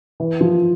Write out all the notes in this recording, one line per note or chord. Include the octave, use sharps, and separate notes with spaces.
E3
F3